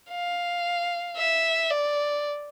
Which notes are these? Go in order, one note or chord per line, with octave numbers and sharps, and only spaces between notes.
F5
E5
D5